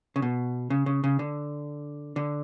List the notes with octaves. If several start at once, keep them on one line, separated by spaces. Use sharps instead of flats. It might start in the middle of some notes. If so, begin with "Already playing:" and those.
C#3
B2
C#3
C#3
C#3
D3
D3